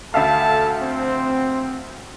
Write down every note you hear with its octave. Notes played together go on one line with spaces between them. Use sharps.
D2 A4 E5 F5 A5
C4